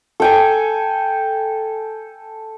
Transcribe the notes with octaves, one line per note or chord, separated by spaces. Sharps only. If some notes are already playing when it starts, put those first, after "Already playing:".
A4 G5 G#5